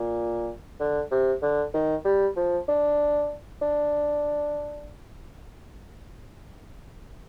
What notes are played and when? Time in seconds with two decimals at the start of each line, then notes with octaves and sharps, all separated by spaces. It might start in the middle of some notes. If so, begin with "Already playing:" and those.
Already playing: A#2
0.80 D3
1.11 C3
1.42 D3
1.74 D#3
2.05 G3
2.36 F3
2.68 D4
3.62 D4